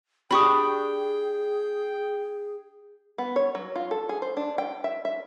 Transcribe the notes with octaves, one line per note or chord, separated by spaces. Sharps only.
D4 G4 G#4 G5 B5 C#6 D#6
B3
C#5
F#3
F4
A4
G#4
C5
D4
G5
E5
E5